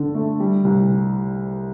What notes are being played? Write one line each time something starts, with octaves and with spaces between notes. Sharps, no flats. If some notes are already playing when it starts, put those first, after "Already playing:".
Already playing: D3 A4
A3
G3
C2